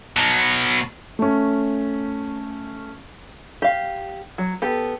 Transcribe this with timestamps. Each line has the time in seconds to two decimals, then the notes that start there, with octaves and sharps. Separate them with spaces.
0.17 B2 F#3
1.19 A3 C#4
3.62 G4 F5
4.38 F#3
4.62 B3 G4 A4